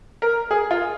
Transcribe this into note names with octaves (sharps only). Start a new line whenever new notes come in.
A#4
G#4
F4